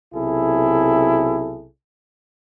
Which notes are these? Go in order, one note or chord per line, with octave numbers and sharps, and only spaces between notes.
B1 C3 E4 G#4 A4